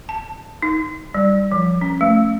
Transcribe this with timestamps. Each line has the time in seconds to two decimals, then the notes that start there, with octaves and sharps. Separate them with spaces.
0.09 A5
0.62 D#4
1.14 G3
1.52 F3
1.81 C#4
2.01 A3